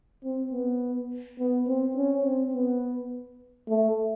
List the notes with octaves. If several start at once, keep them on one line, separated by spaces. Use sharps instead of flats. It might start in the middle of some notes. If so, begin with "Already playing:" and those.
C4
B3
B3
C4
C#4
C4
B3
A3